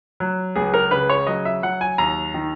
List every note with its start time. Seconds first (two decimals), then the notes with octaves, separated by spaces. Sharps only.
0.20 F#3
0.56 C#2 G#4
0.74 A#4
0.91 C#3 B4
1.09 C#5
1.27 F#3 D#5
1.45 E5
1.63 F#3 F#5
1.81 G#5
1.98 D#2 A#5
2.34 D#3